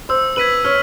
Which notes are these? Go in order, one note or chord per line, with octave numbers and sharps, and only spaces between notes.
C5 E6
B4 G#6 B6 D#7 F#7
C#5 F6